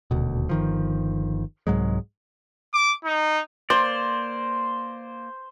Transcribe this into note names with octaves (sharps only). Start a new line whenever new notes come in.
D#1 D2 B2
G1 D#3 F3
C2 G#2 F#3 G#3
D6
D#4
A#3 C5 D5